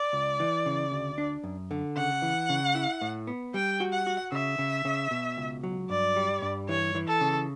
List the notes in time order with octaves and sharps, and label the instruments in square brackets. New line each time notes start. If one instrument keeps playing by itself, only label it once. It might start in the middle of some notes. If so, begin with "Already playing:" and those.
Already playing: [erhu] D5
[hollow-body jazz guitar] C#2
E3
C#3
D2
D4
F#2
D3
[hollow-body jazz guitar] C#3 [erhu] F#5
[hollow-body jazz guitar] E3
C#3
E4
A2
B3
[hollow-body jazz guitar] G3 [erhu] G5
[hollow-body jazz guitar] F#4
[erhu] F#5
[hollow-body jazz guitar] F#4
[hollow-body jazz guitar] C#3 [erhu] E5
[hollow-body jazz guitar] C#3
C#3
B2
C#2
F#3
[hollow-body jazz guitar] G2 [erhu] D5
[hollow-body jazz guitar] G3
G2
[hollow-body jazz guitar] E3 [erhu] C#5
[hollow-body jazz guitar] E3
[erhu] A4
[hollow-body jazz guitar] C#3